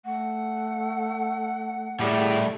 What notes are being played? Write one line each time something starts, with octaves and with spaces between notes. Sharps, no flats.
A3 F#5
A2 G3 A3 G#4